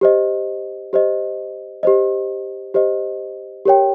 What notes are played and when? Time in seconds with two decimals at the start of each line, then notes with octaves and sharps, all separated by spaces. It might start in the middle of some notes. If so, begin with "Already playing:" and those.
0.01 G4 C5 D#5
0.93 G4 C5 D#5
1.83 G4 C5 D#5
2.74 G4 C5 D#5
3.65 G4 A#4 C#5 G5